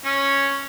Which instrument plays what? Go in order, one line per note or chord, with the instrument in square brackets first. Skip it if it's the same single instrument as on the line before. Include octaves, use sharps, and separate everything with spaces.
[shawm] C#4